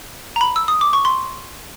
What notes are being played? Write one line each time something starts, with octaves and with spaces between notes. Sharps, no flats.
A#5
B5
E6
D#6
D6
C#6
C6